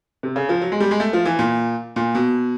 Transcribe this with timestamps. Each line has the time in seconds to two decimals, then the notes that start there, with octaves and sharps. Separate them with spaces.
0.23 C3
0.36 C#3
0.49 F3
0.61 F#3
0.72 G#3
0.80 G3
0.91 G#3
1.00 A3
1.13 F3
1.25 E3
1.39 A#2
1.96 A#2
2.15 B2